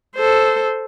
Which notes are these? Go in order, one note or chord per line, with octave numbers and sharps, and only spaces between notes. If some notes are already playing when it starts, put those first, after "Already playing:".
A4 C5